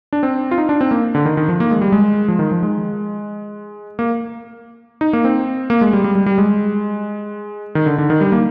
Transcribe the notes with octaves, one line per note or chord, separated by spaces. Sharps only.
D4
C4
F4
D#4
D4
C4
A#3
D3
D#3
D#3
F3
A#3
G#3
G3
G#3
F3
D#3
F3
G#3
A#3
D#4
A#3
C4
A#3
G#3
G3
G3
G3
G3
G#3
D#3
D3
D3
D#3
G3
A#3